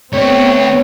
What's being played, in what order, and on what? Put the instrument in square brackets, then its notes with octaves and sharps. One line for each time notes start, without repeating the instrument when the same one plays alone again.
[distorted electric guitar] D3 A3 [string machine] B3 [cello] C4 G5 [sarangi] C#5